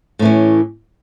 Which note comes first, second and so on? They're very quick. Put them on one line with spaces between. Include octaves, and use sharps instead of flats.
A2 E3 C#4